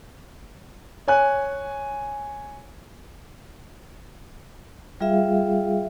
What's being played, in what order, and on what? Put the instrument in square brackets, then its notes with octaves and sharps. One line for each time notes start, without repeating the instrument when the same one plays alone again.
[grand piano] C#5 G#5 F#6
[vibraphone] G3 F4 G#4 E5 F5